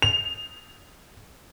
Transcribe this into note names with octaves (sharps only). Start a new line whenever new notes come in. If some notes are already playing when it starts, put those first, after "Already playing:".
F7